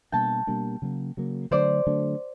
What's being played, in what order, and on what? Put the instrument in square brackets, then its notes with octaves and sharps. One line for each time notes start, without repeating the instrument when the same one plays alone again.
[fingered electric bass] B2 G3 A#3 D4 [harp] G5 A5
[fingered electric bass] B2 G3 A#3 D4
C#3 F#3 A#3
C#3 F#3 A#3
[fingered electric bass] D3 F#3 A3 D4 [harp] C5 D5
[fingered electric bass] D3 F#3 A3 D4